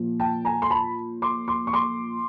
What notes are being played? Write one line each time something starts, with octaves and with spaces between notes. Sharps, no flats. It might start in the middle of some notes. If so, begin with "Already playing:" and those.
Already playing: A#2 F3
G5 A5
G#5 A#5
C6
A5 B5
C6 D6
C6 D6
C#6
C6 D6